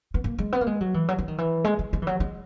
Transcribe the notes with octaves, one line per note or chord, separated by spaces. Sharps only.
B3
A#3
G#3
B3
A#3
G#3
F#3
E3
F#3
E3
D#3
E3
G#3
G#3
G#3
E3
F#3
G#3